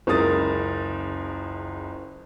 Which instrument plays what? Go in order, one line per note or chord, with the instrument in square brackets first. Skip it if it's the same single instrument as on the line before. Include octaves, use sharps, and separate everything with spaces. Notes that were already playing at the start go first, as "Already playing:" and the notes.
[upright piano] F#1 C#2 A#4 D#6 A6